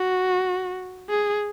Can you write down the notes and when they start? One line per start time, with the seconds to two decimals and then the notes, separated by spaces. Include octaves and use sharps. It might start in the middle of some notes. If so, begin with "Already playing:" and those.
Already playing: F#4
1.10 G#4